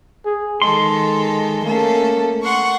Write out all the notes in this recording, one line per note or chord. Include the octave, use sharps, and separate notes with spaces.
G#4
D#3 G#3 A4 C6
A3 A#3 C#4 A4
F#5 C6 C#6